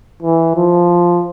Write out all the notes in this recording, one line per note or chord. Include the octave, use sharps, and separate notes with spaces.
E3
F3